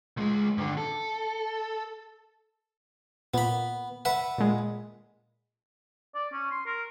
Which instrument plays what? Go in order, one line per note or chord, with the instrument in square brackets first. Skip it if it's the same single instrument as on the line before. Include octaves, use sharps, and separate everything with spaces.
[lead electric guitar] C#2 G#3
G2 D3
A4
[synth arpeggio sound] A#2 [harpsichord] B3 B5
[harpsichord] B4 E5 F#5
[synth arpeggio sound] A#2 G#3
[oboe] D5
C#4
C6
A#4